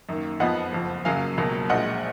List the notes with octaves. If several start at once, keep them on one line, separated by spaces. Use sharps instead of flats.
F#2 D#3 A#3
F2 F3 B3 D#5 F#5
F#1 F2 F3
F#2 C#3 F#3 A#3 F5 G#5
C#2 B2 F#3 A#3
A#1 A#2 G#3 D#5 F#5